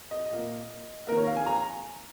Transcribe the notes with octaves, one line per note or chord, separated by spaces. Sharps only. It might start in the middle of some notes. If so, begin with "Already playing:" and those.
D#5
A#2 A#3
D#3 A#3 A#4
C#5
F5
G#5
A#5